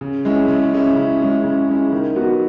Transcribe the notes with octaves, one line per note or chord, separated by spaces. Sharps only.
C#3
G#3 C#4 E4
C#3
G#3 C#4 E4
C#3
G#3 C#4 E4
C#3
G#3 C#4 E4
D#3
F#3 B3 F#4